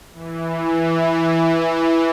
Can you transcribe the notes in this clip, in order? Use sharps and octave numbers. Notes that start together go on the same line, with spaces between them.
E3
E3